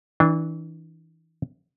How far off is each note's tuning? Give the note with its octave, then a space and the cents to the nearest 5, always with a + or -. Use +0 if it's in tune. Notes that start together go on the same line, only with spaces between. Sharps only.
E3 -25 D4 +0